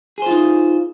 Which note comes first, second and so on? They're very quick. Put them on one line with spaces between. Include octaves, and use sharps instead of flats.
G#4 C5 F4 D#4